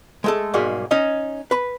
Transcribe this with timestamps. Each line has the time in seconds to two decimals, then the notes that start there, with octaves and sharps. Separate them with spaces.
0.24 G#3 A3 A4
0.54 B1 G#2 G3 A#3 F#4 G#4
0.91 C#4 D#4 D#5
1.51 B4 B5